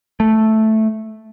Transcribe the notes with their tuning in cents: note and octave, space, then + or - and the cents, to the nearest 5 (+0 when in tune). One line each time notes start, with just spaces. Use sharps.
A3 +0